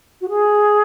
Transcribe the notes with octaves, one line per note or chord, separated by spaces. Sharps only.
F#4
G#4